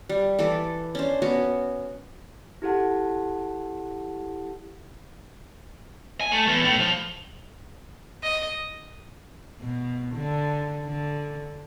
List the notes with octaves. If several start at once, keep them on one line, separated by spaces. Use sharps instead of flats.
G3
E3 A4 B4 D5
C#4 D4 C5
B3 C#4 F#4
E4 G4 A4 F#5 A5
G#5
A3
E2
A2
F3
D#5
B2
D3
D3